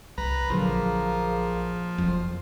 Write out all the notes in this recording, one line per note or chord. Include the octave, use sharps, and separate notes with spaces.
C2 B4 A#5
A#1 D3 F3 F#3 A#3 G#4
F#1 F2